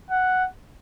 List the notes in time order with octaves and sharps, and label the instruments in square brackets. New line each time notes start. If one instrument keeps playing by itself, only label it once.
[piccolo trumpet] F#5